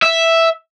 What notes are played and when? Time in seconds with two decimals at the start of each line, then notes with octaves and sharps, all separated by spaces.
0.02 E5